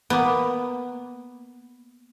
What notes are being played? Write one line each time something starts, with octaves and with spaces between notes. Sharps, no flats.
A#3 B3